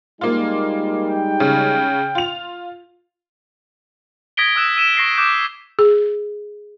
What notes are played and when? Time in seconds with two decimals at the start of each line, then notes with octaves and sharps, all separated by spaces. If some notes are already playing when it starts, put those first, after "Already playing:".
0.21 G3 G#3 A#3 D#4 F4
1.10 G5
1.40 C#3
2.15 F4 F7
4.37 D#6 G#6 A#6 B6 D7 G7
4.55 D#6 E6 F#6 E7
4.76 E6 D#7 E7
4.97 C#6 A#6 C7
5.17 D6 F#6 G6 E7
5.79 G#4